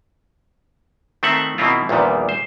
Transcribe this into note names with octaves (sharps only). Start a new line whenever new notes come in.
D#3 A3 C4 A4 E5 F#5
B2 D#3 A#3 C4 E4 F4
A#1 E2 A#2 D#3 G3
C5